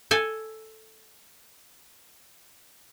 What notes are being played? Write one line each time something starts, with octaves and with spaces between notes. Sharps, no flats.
A4 G#5